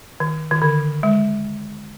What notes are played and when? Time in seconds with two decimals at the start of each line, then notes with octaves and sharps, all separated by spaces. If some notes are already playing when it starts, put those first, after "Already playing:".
0.20 D#3
0.51 D#3
0.62 D3
1.03 G#3